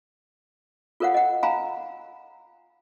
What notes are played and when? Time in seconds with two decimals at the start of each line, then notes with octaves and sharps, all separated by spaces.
1.00 F4 A4 A#4 C#5 F5 F#5
1.14 D#5 F#5
1.43 F5 G#5 A#5 B5